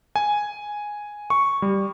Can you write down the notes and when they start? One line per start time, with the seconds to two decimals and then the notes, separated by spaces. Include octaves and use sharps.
0.16 G#5
1.30 C#6
1.62 G3